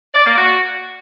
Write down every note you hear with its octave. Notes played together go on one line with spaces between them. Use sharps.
D5
A#3
F#4